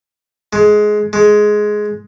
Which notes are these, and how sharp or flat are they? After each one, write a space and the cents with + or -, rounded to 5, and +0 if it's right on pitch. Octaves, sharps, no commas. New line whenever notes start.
G#3 +15
G#3 +10